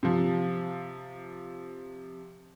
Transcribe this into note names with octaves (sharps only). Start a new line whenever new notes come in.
C3 F3